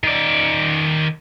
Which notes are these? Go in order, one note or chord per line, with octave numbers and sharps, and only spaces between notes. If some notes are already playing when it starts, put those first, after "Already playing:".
D#3 D5